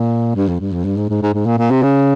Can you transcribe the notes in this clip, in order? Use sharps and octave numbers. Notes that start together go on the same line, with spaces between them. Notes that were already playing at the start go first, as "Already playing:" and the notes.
Already playing: A#2
G2
F2
G2
F2
G2
G#2
G#2
G#2
G#2
A#2
A#2
C3
C#3